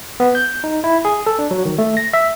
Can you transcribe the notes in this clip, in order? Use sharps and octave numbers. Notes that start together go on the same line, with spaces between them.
B3
G6
D#4
E4
G#4
A4
D4
F#3
D#3
A3
A#6
E5